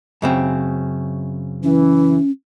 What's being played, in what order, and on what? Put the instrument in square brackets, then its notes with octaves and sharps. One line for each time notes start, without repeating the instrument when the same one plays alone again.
[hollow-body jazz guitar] F#2 C#3 C4
[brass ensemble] E3 [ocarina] C#4